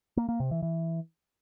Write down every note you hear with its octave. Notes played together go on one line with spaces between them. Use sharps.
A#3
A#3
C3
E3
E3